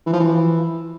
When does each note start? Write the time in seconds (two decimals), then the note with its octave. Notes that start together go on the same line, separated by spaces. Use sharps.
0.06 E3
0.13 F3
0.20 E3